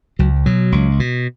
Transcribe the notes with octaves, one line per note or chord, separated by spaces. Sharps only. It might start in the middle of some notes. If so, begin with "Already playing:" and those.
C#2 F#3
B2 F#3
C#2
B2